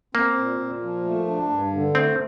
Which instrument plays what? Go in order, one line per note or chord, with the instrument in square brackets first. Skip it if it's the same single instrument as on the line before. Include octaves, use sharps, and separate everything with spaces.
[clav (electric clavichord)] A#3 [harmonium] C4
[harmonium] A#2
A#2
F3
A3
D4
G2
D3
[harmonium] A3 [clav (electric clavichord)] C4